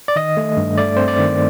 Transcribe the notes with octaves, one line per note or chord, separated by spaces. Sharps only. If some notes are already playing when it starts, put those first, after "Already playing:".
D5
D#3 D#5
A3
G2
A3 D5
C4 C5
D5
D#3